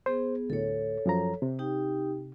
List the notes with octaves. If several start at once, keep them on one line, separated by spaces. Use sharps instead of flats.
B3 G#4 C5
D2 A2 A4 C#5
F#2 F3 A#5
C3
D#4 G4 G5